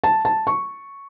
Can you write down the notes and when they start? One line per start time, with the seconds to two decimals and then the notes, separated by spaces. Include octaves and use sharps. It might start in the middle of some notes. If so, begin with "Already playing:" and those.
0.04 A5
0.25 A5
0.47 C#6